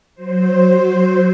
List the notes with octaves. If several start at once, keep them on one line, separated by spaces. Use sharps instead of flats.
F#3 C5